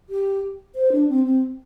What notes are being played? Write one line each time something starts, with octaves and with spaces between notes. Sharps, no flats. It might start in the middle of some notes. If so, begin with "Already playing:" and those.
G4
C5
D4
C4
C4